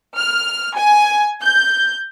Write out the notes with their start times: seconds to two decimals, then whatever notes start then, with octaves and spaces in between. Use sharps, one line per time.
0.16 F6
0.75 G#5
1.41 G6